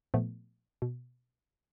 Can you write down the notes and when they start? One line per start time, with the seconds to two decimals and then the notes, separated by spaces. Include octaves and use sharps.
0.14 A#2 F3 A3 B3
0.82 B2